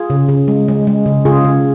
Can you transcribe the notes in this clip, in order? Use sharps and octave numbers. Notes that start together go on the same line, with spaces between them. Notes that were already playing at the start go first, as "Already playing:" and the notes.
Already playing: F4 G#4
C#3
C#3
G#3
G#3
G#3
C#3
C#3 F4 G#4
C#3